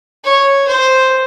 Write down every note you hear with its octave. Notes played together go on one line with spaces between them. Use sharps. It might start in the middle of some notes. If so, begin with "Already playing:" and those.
C#5
C5